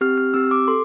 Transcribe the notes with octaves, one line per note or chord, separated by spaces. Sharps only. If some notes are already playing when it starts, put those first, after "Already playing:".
C4 G4 F6
F6
C4 G4 E6
D6
A4 C6